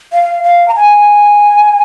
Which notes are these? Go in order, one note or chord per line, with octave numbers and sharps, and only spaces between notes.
F5
F5
A#5
G#5